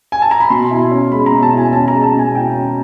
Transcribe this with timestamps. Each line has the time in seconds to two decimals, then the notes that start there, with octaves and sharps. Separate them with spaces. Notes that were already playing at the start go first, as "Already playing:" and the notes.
0.12 G#5
0.22 A5
0.31 A#5
0.40 B5
0.50 B2 C6
0.71 E4
0.92 C#4
1.11 G#3 B5
1.26 A#5
1.32 B2
1.42 A5
1.53 E4 G#5
1.73 C#4 A5
1.88 A#5
1.93 G#3
2.03 A5
2.15 B2 G#5
2.34 E4 G5
2.55 C#4